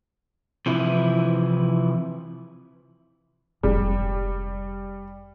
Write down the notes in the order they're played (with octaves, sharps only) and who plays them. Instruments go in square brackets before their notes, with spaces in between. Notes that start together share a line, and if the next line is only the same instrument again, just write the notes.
[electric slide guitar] C3 E3 F3 E4
[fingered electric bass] F1 G#2 [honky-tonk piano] G3